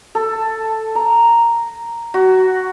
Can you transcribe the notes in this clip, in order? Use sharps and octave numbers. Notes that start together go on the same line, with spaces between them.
A4
A#5
F#4